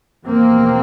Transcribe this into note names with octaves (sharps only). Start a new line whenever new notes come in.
F1 E2 B2 A#3 C4